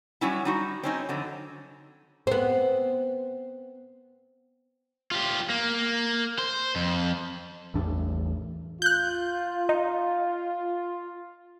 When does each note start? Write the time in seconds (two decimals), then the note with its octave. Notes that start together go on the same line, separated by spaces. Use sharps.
0.21 F#3 G3 C#4 E4
0.45 G3 D#4 F#4
0.83 C4 C#4 D#4
1.09 F2 D3 F#3
2.27 B3 C4
5.11 F4 G4
5.50 A#3
6.39 C5
6.76 F2
7.74 A1 E2 D4
8.82 F4 F#6 G6
9.69 D#4